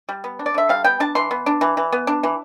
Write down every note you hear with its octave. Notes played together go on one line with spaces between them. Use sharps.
G3
B3
D4
D5
D3 E5
G3 F5
B3 G5
D4 A5
E3 C6
B3
D4
E3
E3
B3
D4
E3